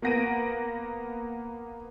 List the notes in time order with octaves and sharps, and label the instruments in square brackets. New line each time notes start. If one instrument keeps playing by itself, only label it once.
[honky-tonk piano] A#3 B3 F#5 A#6 D7 D#7